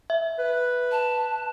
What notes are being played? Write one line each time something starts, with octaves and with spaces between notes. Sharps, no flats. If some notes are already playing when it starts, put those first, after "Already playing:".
E5
B4
A5